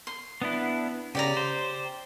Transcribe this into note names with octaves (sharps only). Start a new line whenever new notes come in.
C6
B3 D4 E4
C#3 G4 D5 A#5
C5